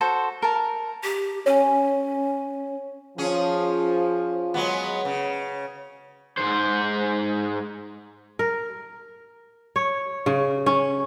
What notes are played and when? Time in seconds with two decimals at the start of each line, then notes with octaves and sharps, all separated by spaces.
0.01 F#4 A4 C5
0.42 A#4 A5
1.03 G4
1.46 C#4 C#5 G#5
3.18 F3 C#4 G#4
4.54 F#3 G#3 B3
5.05 C#3
6.37 G#2 C5
8.39 A#4
9.76 C#5
10.26 C#3
10.66 C#4